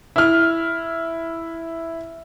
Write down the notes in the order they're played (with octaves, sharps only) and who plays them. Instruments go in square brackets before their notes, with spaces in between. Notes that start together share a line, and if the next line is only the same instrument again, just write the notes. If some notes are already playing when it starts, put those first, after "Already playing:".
[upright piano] E4 F6